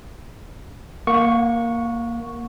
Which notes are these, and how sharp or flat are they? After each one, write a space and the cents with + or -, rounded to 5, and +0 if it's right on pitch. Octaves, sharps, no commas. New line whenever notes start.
A#3 +0 F#5 -35 C#6 +0